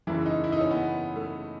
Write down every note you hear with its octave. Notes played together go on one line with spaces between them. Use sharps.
F#1 E2 C#3 E3 E4
D#4
E4
D#4
C#4
B3
A3